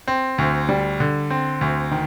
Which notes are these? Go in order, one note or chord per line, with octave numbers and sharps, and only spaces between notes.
C4
D2
G3
D3
C4
D2
D#3